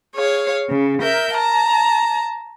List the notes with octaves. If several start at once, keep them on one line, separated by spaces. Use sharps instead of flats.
G#4 C#5 F5
C#3
A#4 E5 G6
A5 A#5